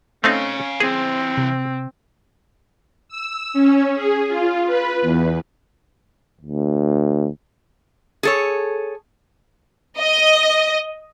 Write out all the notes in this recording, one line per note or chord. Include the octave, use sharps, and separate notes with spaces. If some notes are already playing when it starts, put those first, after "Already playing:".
A3 C4 C#4 D#4 F5 G#5
E3 C4 G#4 C5
C3
E6
C#4
G#4
F4
B4
E2
D2
G#4 A4 C#5
D#5